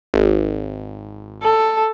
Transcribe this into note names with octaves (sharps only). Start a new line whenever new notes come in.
G#1
A4